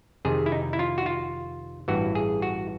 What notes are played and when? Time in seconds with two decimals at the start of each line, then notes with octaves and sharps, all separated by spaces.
0.25 F2 C3 D#3 G#4
0.46 E4
0.52 D#4
0.73 E4
0.79 F4
0.98 F#4
1.06 F4
1.88 A1 G2 E3 F#4
2.15 G#4
2.42 F#4